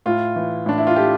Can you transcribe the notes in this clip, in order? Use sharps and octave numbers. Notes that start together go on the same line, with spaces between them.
A2 F4
E3
A2 D4
E4
F4
A3 G4